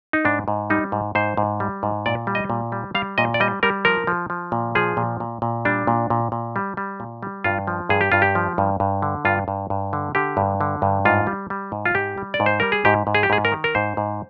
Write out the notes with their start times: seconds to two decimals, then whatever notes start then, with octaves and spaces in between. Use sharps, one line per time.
0.13 D#4
0.25 G#2 D4
0.48 G#2
0.70 G3 D#4
0.92 G#2
1.15 G#2 C5
1.37 G#2
1.60 G3
1.83 G#2
2.06 A#2 D5
2.27 G3
2.35 D#5
2.50 A#2
2.72 G3
2.95 G3 F5
3.18 A#2 D#5
3.34 D5
3.40 G3 D#5
3.63 G3 A#4
3.85 F3 A#4
4.07 F3
4.30 F3
4.52 A#2
4.75 F3 G#4
4.97 A#2
5.20 A#2
5.42 A#2
5.65 G3 D4
5.87 A#2
6.10 A#2
6.32 A#2
6.56 G3
6.77 G3
7.00 A#2
7.23 G3
7.44 G2 F4
7.67 F3
7.89 G2 G#4
8.01 G4
8.12 G2 F4
8.22 G4
8.35 F3
8.58 G2
8.80 G2
9.02 D3
9.25 G2 F4
9.48 G2
9.70 G2
9.93 D3
10.15 D3 G4
10.37 G2
10.61 D3
10.82 G2
11.05 G#2 F4
11.27 G3
11.50 G3
11.72 G#2
11.86 F4
11.94 G#2 G4
12.18 G3
12.34 D5
12.40 G#2
12.46 C5
12.60 G3 A#4
12.72 G#4
12.85 G#2 G4
13.07 G#2
13.15 G#4
13.23 G4
13.30 G#2 G#4
13.45 A#4
13.52 D#3
13.64 A#4
13.75 G#2 C5
13.97 G#2